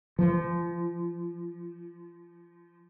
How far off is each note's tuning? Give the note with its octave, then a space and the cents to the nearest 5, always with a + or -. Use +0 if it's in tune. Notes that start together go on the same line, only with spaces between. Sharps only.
F3 -25